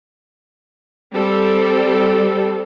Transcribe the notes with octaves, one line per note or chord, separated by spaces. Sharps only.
G3 C4 A4